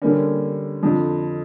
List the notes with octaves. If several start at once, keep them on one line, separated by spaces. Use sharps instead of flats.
D3 G3 A#3 C#4
F2 D3 F3